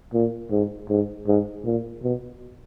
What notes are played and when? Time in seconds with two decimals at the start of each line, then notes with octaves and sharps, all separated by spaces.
0.14 A#2
0.51 G#2
0.89 G#2
1.27 G#2
1.65 A#2
2.03 B2